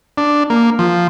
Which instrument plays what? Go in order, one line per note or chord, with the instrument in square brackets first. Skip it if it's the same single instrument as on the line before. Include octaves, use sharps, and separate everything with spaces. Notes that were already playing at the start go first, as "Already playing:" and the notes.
[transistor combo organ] D4
A#3
F3